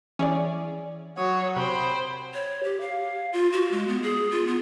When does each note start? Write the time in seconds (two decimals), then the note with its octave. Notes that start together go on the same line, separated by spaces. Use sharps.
0.19 E3 C#4 G#4 D5
1.17 F#3 F#4 C#5 D#6
1.56 C3 C5 G5 B5
2.34 C#5
2.63 G4
2.81 F5
3.33 F4
3.53 F#4
3.71 G#3
3.88 B3
4.02 G#4
4.31 F4
4.47 B3